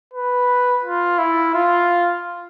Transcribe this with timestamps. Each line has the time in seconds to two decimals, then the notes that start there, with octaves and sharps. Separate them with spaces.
0.14 B4
0.84 F4
1.19 E4
1.54 F4